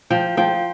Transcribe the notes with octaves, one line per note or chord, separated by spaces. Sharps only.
F3 G5
F3 G5